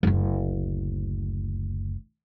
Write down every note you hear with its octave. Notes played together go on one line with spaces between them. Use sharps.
F#1 D2